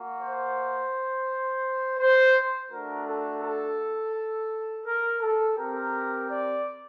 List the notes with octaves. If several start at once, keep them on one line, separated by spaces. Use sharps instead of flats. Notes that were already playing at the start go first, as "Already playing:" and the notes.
Already playing: A#3 F#4
C5
C5
A3 D4 F#4 A#4
A4
A4
A#4
A4
C4 G4 A#4
D5